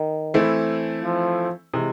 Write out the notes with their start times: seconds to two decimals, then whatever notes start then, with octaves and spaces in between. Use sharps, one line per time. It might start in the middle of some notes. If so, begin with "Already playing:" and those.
Already playing: D#3
0.34 E3 A3 C4 E4
1.03 F3
1.74 C3 E3 G#3